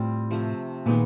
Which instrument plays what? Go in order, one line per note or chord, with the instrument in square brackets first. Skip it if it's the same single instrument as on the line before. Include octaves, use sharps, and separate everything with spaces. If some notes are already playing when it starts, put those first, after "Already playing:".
Already playing: [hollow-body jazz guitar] A2 [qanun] G3 C4 F4
[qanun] C3 F3 A3
[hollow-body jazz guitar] A#2 [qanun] D#3 G#3 B3